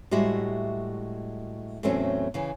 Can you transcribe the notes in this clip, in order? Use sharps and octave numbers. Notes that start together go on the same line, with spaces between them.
A2 G3 G#3 F#4 E5
E2 A2 F#3 A3 C4 C#4
C#3 E3